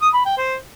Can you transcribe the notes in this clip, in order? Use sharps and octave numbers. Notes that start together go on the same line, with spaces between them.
D#6
B5
G5
C5